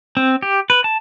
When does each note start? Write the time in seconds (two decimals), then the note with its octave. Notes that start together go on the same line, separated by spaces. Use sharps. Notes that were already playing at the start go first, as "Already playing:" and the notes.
0.17 C4
0.43 G4
0.70 B4
0.84 A5